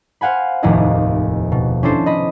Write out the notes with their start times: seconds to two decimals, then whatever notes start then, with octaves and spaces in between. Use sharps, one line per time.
0.21 C5 F5 F#5 G#5 B5
0.63 F1 D#2 A2 E4 G#4 D#5
1.52 B2
1.83 C#4 D4 E4 A4 C5
2.06 D#5 B5